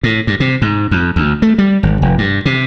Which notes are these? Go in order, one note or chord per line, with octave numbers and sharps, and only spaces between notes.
A2
G2
C3
G#2
F2
D2
A3
G3
G#1
F1
G2
C3